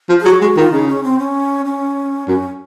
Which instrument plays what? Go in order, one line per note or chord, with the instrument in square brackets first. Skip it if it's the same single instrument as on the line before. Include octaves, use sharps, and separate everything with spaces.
[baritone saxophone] F3
[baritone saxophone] F#3 [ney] G#4
[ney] F#4
[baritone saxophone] G#3 [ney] F#4
[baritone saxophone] D#3 [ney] F4
[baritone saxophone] C#3 [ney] D#4
[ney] C#4
C4
C#4
C#4
[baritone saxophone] F#2 [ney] C#4